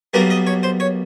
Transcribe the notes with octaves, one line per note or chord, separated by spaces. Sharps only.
B1 B2 G3 A#3 A#4
D#5
C#5
C5
C#5